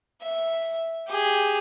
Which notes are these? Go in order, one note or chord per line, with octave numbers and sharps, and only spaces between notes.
E5
G4 G#4